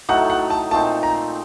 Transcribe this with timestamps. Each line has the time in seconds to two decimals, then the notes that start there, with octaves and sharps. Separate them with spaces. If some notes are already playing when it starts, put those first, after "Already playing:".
0.09 A2 F#3 A3 D#4 F#5
0.30 F#5
0.50 A5
0.71 A#2 A3 C4 D#4 A5
1.03 A#5